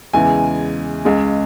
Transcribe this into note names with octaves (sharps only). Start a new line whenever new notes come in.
E2 C#3 E3 G#3 G#5
C#2 C#3 G#3